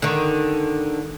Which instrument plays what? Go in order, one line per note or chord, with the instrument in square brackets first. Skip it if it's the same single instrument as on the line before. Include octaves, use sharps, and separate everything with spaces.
[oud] D3 D#3